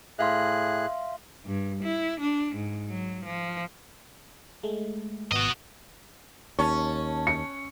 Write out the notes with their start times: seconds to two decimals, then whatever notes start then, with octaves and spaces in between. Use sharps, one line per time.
0.19 A2 G#4 E5 F5 C6 F#6
1.45 G2
1.83 E4
2.20 D4
2.55 G#2
2.88 F#3
3.25 F3
4.63 G#3 A3
5.32 G#1 B3 F#4 D#5
6.59 D#2 C#4 A5 C#6
7.27 C#7